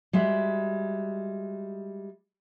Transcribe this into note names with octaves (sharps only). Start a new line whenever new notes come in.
G3 G#3 F#4 E5